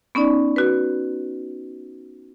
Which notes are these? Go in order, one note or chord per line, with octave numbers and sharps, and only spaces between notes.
B3 C#4 D#4 D5
F#4 B4